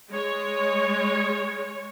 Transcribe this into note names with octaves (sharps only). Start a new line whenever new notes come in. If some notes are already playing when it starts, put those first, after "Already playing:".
G#3 C#5